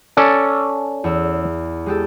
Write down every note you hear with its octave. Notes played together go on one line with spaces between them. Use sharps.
C#4 A4 D5
E2 E6
G#3 G4 A4